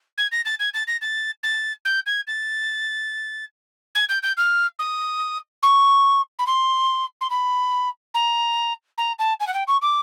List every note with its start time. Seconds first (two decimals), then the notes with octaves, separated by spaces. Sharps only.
0.18 G#6
0.32 A#6
0.45 A6
0.60 G#6
0.74 A6
0.87 A#6
1.02 A6
1.43 A6
1.85 G6
2.06 G#6
2.27 A6
3.95 G#6
4.09 G6
4.23 G6
4.37 F6
4.79 D#6
5.63 C#6
6.39 B5
6.47 C6
7.21 C6
7.30 B5
8.14 A#5
8.98 A#5
9.19 A5
9.40 G#5
9.47 F#5
9.54 G5
9.68 C#6
9.82 D6